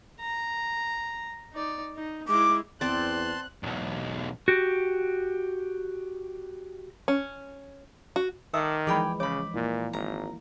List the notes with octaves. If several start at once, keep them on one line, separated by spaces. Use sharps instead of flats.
A#5
D#4 D5
D#4
G#3 E4 D6
E2 C4 D5 A5 C6 F#6
B1 E2
F#4 G4
C#4
F#4
D#3 A4 D5 E5 D#6 E6
E3 F3 G#3 G#4 D5 G5 G#5 B5
C#3 C#5 B5 D6
A#2 A#3 E4
G#1 A#5